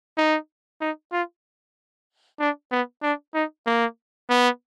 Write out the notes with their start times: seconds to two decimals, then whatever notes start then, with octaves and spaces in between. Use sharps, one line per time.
0.17 D#4
0.81 D#4
1.12 F4
2.40 D4
2.71 B3
3.03 D4
3.34 D#4
3.66 A#3
4.30 B3